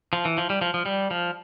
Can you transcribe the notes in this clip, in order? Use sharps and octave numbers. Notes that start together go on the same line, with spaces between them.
F3
E3
F3
G3
F3
F3
G3
F3